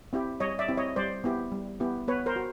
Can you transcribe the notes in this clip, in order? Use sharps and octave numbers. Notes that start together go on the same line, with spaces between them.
C4 E4 G4
G3 C#5 D#5
D5 E5
C4 E4 G4
C#5 D#5
G3 C5 D5
B3 E4 G4
G3
B3 E4 G4
B3 B4 C#5
A#4 C5
F#4